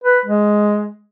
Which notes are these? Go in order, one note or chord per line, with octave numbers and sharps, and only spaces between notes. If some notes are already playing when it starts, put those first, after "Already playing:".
B4
G#3